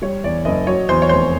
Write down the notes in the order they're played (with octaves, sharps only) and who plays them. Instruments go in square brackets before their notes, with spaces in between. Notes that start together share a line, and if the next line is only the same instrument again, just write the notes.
[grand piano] G3 [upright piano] C#5
[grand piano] E2 [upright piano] D5
[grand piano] F#1 [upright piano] D#5
[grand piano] F#3 [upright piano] C#5
[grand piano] E2 [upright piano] C5
[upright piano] C#5
[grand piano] F1 [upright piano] C5